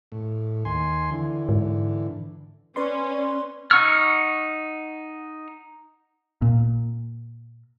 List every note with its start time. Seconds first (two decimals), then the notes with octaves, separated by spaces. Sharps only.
0.12 A2
0.65 D#2 G#5 C6
1.11 D3 E3
1.49 G#2
2.76 C#4 B4 D5 C6
3.71 D#4 F#5 C#6 E6 F6
6.42 A#2